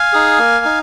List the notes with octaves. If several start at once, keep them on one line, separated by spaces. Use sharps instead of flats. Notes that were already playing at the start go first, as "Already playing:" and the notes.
Already playing: F5 G#5
D#4 G#4
A#3
D#4